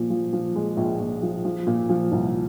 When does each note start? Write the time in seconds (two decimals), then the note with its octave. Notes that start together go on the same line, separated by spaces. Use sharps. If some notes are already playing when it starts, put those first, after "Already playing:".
Already playing: A#2 F3
0.10 F3
0.33 F3
0.56 G#3
0.77 A#1
0.99 A#1
1.22 F3
1.45 F3
1.67 A#2
1.89 F3
2.12 C2